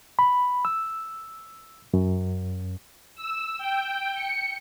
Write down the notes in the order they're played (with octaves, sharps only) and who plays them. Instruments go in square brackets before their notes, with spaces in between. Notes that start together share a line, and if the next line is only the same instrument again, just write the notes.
[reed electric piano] B5
E6
F#2
[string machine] E6
G5
C#7